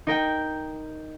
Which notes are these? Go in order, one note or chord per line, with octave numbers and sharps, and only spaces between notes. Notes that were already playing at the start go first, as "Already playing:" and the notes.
D#4 A#4 G5